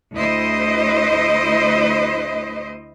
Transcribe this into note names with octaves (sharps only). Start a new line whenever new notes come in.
D2 E4 C5 D#5